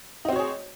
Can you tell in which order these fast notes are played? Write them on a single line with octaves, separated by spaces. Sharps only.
D#4 C4 F#4 C#5 G#4